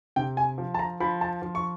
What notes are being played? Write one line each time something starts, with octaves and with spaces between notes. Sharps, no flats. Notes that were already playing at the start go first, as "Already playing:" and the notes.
C3 G5
G#5
F3
A5
A#5
F3 B5
A5
F3
C#6